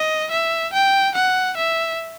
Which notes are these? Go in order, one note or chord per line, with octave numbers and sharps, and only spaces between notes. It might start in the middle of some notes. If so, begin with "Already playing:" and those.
Already playing: D#5
E5
G5
F#5
E5